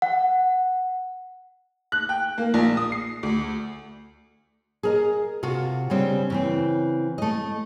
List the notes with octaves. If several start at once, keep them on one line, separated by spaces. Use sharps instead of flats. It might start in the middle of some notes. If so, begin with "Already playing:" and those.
F#5
F#6
G5
A#3
A#1
D#6
C7
D2
G#4 A#4 D#5
C3 F4 F#4 A4
C#3 G3 C4 D4
C#3 E3 C4
A3 D#5